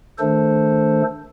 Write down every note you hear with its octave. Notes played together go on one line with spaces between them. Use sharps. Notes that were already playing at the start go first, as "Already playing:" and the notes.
D#3 A3 D4 A4 C5